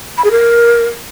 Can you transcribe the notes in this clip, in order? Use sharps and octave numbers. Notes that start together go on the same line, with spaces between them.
B5
G#4
A#4